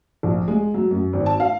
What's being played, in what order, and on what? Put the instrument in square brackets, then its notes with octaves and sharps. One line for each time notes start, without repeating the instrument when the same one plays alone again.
[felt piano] A#1
G#3
F#3
F#2
G#1
A5
F5